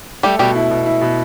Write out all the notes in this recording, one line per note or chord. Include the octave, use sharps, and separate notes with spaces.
G3 A3 G4
B2 G3 G4
E4
B2
E4
B2